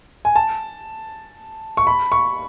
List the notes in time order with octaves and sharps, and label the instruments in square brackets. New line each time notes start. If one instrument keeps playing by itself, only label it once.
[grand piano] G#5
A5
C#6
B5
C#6